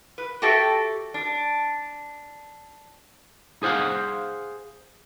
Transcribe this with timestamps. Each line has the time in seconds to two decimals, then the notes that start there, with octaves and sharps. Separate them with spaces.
0.18 B4
0.42 F#4 G4 A4 E5 G5
1.14 D4
3.63 G#4 C5 F5 F#5